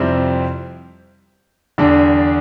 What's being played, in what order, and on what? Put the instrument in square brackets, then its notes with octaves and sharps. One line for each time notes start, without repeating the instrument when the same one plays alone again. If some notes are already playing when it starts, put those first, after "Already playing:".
Already playing: [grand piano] F2 C3 G3 C4 E4
E2 D3 G3 D4